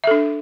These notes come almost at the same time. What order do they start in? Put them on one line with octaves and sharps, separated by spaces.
E5 A4 D4